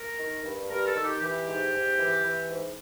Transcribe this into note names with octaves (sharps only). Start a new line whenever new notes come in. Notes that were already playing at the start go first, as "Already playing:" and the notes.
Already playing: A#4
D#3
G2
G2 A#4
A4
D#3
G4
E3 G4
G#2
G#2
E3
E3
G#2